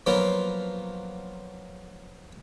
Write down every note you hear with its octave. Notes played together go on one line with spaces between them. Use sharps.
F3 F#3 A#3 B3 F4